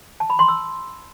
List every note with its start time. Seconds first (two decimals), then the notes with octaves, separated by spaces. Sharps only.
0.20 A5
0.30 B5
0.39 C6
0.48 E6